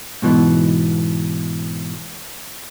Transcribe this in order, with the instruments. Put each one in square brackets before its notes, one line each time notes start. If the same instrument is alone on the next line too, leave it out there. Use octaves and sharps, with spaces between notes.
[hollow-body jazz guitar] G#2 B2 E3